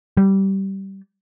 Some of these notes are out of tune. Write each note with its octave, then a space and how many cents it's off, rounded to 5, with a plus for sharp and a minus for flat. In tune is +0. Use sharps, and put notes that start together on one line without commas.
G3 -15